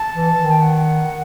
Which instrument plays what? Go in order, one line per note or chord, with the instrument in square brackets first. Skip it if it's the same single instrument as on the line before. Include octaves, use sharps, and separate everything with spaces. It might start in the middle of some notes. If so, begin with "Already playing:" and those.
Already playing: [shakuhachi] A5
[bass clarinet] E3
D#3
[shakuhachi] G5
F#5